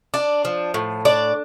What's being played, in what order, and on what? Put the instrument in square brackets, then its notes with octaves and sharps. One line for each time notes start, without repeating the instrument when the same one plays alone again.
[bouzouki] D4 D5
F3
A2
D4 D5